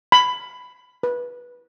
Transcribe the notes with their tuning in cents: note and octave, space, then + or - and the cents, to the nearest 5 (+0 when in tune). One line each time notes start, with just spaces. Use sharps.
B5 +15
B4 -15